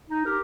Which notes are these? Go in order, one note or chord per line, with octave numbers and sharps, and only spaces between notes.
D#4
G4 A#4